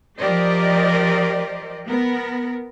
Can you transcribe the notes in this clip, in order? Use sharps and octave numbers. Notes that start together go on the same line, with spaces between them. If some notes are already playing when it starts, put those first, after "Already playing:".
F3 G4 A#4 C5 D5 D#5
B3 A#4